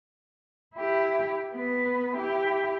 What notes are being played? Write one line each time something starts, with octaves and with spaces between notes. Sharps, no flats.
E4 G4
B3 B4
E4 G4